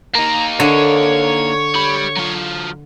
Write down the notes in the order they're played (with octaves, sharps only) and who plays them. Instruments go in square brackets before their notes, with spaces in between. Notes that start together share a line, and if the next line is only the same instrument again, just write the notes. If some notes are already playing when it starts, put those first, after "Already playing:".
[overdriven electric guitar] A#3 D#4 [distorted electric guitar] A#5
[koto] D3 [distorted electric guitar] C#5
[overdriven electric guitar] G4 B5
F#3 F4